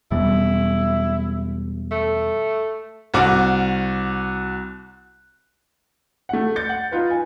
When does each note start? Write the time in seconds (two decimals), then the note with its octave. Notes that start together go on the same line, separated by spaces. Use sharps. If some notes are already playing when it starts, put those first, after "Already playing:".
0.11 E2 B2 G3 E4
1.91 A3
3.14 C2 F#4 D6
6.29 A3 F#5
6.56 G6 A6 C#7
6.69 F#5
6.92 D#4 F4 B4
7.11 G#5